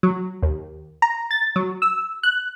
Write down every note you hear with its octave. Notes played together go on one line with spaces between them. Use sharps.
F#3
D#2
A#5
A6
F#3
E6
F#6